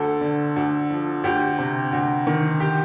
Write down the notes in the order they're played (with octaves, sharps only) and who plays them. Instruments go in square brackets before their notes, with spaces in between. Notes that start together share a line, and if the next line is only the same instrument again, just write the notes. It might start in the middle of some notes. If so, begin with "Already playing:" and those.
Already playing: [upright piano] D2 A4
D3
D2
F3
D2 G4
C3
D2
D#3
G4